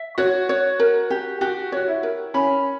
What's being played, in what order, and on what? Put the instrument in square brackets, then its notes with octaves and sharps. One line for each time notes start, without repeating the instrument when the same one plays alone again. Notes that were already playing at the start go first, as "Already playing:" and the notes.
Already playing: [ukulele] E5
[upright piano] F#4 [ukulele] C#5
[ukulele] C#5
A#4
G4
[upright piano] F#4 [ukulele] G4
[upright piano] F#4 [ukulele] C#5
[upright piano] E4
[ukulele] A#4
[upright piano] C#4 [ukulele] B5